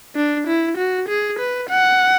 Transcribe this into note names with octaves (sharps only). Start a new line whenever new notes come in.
D4
E4
F#4
G#4
B4
F#5